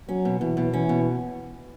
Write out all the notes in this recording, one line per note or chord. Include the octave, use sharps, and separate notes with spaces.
F#3 C#4
B2
B2 E3
B2
E3 C#4
B2